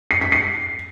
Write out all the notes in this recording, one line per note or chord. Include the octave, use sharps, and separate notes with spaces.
C7
B6
C7